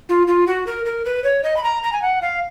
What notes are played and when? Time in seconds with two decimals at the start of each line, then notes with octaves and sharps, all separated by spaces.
0.09 F4
0.27 F4
0.47 F#4
0.67 A#4
0.85 A#4
1.05 B4
1.24 C#5
1.44 D#5
1.57 B5
1.63 A#5
1.83 A#5
1.93 G#5
2.02 F#5
2.22 F5